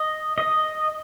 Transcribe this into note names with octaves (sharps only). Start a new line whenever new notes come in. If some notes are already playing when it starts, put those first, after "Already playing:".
Already playing: D#5
D#5